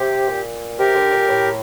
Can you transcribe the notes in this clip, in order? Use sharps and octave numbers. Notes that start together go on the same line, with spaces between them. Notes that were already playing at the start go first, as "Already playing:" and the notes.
Already playing: C3 G4
A#2
C3 G4 A#4
D3
A#2
A2